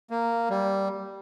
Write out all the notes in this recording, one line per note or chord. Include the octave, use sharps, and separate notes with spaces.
A#3
G3